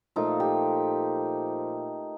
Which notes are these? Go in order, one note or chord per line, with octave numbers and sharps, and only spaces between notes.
A#2 F3 A3 D#4
G4